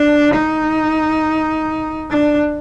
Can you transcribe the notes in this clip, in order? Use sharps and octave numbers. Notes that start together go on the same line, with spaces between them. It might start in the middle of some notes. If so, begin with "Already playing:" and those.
Already playing: D4
D#4
D4